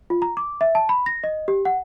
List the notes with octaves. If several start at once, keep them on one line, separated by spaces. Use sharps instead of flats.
F4
A#5
D6
E5
A5
B5
A#6
D#5
G4
F#5